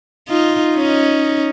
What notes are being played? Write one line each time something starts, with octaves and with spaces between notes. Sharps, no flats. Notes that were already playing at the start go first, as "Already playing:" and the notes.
D#4 F4
C#4 D#4